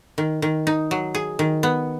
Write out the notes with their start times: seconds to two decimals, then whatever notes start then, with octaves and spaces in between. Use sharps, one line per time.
0.18 D#3
0.42 D#3
0.67 D#4
0.91 F#3
1.15 G#4
1.39 D#3
1.63 B3